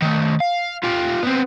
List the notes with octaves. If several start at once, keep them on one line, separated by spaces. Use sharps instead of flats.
D#3 A3
F5
F4 G4
B3 C4